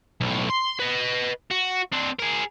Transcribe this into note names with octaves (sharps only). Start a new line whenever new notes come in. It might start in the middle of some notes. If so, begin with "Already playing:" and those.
B1 A2
C6
B4 D#5
F#4
C4 D4
G#4 A#4